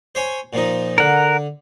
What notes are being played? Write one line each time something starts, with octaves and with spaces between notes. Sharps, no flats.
C5 C#5 G#5
A#2 F3 D#4
D3 A#4 F#5